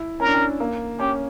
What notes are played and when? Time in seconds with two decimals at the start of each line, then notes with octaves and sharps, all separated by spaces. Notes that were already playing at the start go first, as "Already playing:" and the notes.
Already playing: E4
0.20 C#4 A#4
0.27 D4
0.34 C#4
0.60 A#3
1.00 C#4 G4